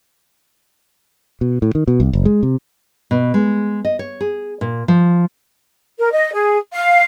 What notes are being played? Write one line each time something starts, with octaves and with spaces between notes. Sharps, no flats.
B2
A2
D#3
B2
C2
F#1
G#3
C3
B2
G#3
D#5
C#5
G#4
A#2
F3
A#4
D#5
G#4
F5